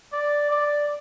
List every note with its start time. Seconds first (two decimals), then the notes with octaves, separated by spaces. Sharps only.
0.13 D5
0.51 D5